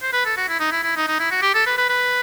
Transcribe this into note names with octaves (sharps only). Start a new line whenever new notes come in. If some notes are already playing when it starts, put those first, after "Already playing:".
C5
B4
A4
F#4
E4
D#4
E4
E4
D#4
D#4
E4
F#4
G4
A4
B4
B4
B4